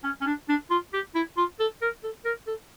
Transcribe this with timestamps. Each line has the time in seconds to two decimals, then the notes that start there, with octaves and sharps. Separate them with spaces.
0.04 C#4
0.21 C#4
0.27 D4
0.49 D4
0.70 F4
0.93 G4
1.15 E4
1.37 F4
1.60 A4
1.82 A#4
2.04 A4
2.25 A#4
2.47 A4